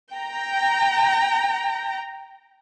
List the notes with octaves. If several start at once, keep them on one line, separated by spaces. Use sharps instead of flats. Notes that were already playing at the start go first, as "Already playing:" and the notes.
G5 A#5